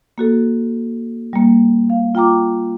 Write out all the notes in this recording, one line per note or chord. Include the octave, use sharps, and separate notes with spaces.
A#3 F#4 A4
G3 A#3
F5
F4 G5 A#5 D6